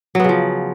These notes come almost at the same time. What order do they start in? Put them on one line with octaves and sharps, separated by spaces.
F#3 B3 C#3 F3